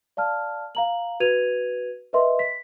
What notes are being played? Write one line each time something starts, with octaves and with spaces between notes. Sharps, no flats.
D5 F5 A5 F6
F5 A#5 F#7
F#4 B4 G#6 D#7 F7
A#4 B4 D#5 E5 C6
B6